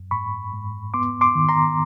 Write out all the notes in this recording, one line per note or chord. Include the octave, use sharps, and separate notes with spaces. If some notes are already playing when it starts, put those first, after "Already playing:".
Already playing: F#2
G#2 B5 C#6
G#2
B3 C6 D6
C6 D6
D#3
A#5 C6